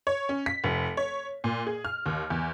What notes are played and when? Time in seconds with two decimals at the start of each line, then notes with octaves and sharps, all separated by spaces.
0.07 C#5
0.29 C#4
0.46 B6
0.64 F1
0.97 C#5
1.44 A#2
1.67 G#4
1.85 F6
2.06 D#2
2.30 E2